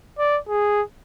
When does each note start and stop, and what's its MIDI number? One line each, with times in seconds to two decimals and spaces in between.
0.18 0.38 74
0.49 0.82 68